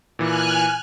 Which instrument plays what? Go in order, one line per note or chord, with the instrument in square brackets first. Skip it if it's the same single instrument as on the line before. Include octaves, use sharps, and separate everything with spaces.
[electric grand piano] A#2 E3 [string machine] G#5 F6 F#6